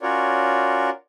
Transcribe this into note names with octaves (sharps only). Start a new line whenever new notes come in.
C#4 F4 F#4 A#4 C#5 D5